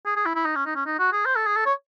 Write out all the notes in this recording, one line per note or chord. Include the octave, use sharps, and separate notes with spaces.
G#4
G#4
E4
E4
D#4
C#4
D#4
C#4
D#4
F#4
G#4
C5
A4
G#4
A4
C#5